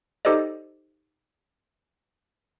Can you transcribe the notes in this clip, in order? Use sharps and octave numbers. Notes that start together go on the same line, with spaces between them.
D#4 G4 A4 C5 D5 D#5